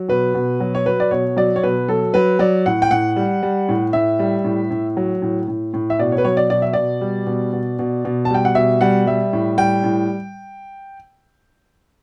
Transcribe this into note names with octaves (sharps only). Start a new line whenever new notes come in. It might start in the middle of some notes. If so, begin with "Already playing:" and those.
Already playing: F#3
B2 B4
B2
F#3
C#5
F#3 B4
D5
B2 C#5
F#3 D5
C#5
B2 B4
F#3 A4
F#3 B4
F#3 D5
A2 F#5
G5
A2 F#5
G3
G3
A2
A2 E5
G3
A2
A2
F#3
A2
A2
A2
E5
B2 D5
C#5
B4
F#3 C#5
D5
B2 D5
E5
B2 D5
G3
B2
B2
B2
B2
A5
G3 G5
F#5
B2 E5
G3 F#5
G3 E5
A2
G3 G5
A2